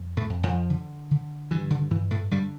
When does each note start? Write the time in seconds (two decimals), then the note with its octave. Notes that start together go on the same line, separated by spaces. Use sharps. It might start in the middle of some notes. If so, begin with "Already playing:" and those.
Already playing: F2
0.17 A2 A3
0.30 F2
0.43 F2 F3
0.70 D3
1.11 D3
1.51 G2 E3
1.70 D3
1.91 G2 E3
2.11 A2 A3
2.31 G2 D3 G3